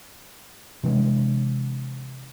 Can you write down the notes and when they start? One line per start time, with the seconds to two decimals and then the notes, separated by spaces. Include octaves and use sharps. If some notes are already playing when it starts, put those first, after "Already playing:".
0.83 C3 E3 G#3 D4